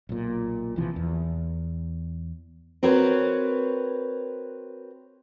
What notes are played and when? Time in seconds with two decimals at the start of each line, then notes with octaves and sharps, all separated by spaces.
0.09 B1 A#2
0.76 A#1 C3 E3 F3
0.96 E2
2.83 C4 F#4 A#4 B4 C#5